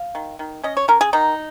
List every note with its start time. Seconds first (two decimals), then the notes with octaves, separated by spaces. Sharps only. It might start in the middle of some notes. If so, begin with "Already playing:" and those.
Already playing: F5
0.15 D#3
0.39 D#3
0.63 C#4 D#5
0.77 C#5
0.88 C#4 A#4
1.01 G#4
1.13 D#3 D#4